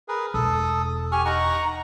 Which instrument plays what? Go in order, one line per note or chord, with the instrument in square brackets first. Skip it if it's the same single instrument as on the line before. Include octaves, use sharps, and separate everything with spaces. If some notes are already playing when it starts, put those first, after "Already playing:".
[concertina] G#4 A#4 B4
[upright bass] E1 [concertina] A4 D#6
[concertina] G4 C#6 F6 [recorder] G#5
[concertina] D#4 F#5 C#6 [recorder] A#5